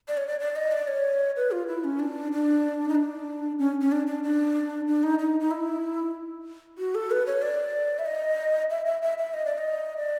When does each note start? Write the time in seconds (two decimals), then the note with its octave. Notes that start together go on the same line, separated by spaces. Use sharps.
0.08 D5
0.17 C#5
0.28 D5
0.40 D5
0.56 D#5
0.72 D5
0.88 C#5
1.36 B4
1.51 F4
1.67 E4
1.84 C#4
1.99 D4
2.32 D4
2.89 D#4
2.95 D4
3.59 C#4
3.81 C#4
3.92 D4
4.07 D4
4.23 D4
4.87 D4
5.03 D#4
5.19 D#4
5.40 D#4
5.51 E4
6.78 F#4
6.95 A4
7.11 B4
7.26 C#5
7.42 D5
7.99 E5
8.06 D#5
8.70 E5
8.86 E5
9.02 E5
9.18 E5
9.34 D#5
9.45 D5
9.58 D#5
9.97 D5